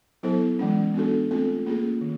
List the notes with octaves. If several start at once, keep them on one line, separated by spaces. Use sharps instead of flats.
F#3 B3 E4 A4 C5
E3 G#3 C#4
B3 D4 F#4 A4
A3 C4 F4 A4
A#3 C#4 F4 G#4
D#3